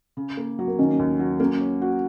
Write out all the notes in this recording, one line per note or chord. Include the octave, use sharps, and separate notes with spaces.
C#3
A#3
F#3
A#3
D#3 C#4
D#2
F#3
A#3 C#4
C#5
F#4